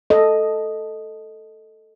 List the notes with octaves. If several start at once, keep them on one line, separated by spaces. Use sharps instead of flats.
A4 D#5